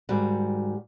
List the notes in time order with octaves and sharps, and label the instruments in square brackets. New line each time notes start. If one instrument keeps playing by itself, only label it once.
[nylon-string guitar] G#2 D#3 G3 F#4